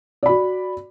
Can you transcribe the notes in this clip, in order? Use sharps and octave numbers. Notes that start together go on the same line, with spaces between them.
F#4 D5 B5